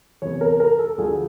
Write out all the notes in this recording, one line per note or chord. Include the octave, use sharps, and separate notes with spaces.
E2 C3 E3 C#5
A#4
A#4
A4
D2 D3 F3 A3 G#4